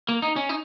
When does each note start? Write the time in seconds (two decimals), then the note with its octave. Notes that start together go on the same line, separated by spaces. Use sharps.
0.09 A#3
0.22 D#4
0.36 C#4
0.49 D#4